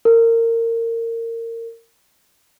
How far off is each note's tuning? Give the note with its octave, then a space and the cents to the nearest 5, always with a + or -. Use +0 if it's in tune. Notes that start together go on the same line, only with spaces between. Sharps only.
A#4 -25